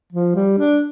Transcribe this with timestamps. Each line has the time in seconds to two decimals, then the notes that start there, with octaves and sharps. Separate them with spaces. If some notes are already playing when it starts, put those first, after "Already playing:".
0.13 F3
0.35 G3
0.58 D4